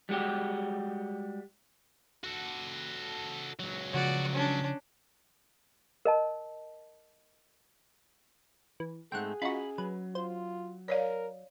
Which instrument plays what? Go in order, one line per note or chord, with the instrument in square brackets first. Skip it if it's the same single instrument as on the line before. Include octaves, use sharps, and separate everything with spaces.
[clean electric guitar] G3 G#3 F#4 G4
[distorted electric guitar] F#4 A4
C#2 F#3
[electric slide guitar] C#3 F3 C#5 [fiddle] F#4 D5
[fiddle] C#4 D4
[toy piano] A#4 D#5 A5
[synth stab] E3
[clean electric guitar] G#2 A3 C4 [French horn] G#4 [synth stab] F#5 G5
[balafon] C#4 D#5 [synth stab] F4 F#4 [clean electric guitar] B5
[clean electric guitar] F#3 [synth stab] B4
[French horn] F4 [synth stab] C5
[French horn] A#4 [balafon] C#5 D5 F5